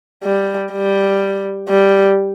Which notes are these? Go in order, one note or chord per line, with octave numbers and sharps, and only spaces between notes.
G3
G3
G3